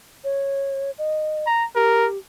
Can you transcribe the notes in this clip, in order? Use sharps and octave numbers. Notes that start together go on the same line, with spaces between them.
C#5
D#5
A#5
G4 A#4